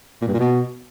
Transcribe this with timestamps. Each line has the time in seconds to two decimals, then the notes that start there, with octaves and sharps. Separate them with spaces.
0.22 A#2
0.28 G2
0.34 A#2
0.40 B2